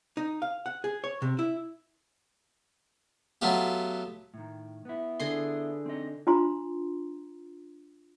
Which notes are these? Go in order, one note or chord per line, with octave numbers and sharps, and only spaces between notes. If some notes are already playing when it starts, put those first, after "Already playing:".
D#4
F5
F#5
G#4
C#5
C3
E4
F#3 A3 B3 F4 G4
A2 D#3
B3 E4
D3 G#4 C6
C4 D#4 D#5
D4 F4 A#5 C6